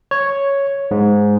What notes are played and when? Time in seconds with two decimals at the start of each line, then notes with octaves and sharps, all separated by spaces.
0.11 C#5
0.91 G#2